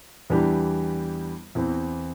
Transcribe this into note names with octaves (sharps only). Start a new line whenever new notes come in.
E2 E3 G3 D4 G4
E2 E3 C4